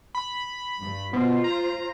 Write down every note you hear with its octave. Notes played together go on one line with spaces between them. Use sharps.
B5
G2
B2 F4 C5
A#5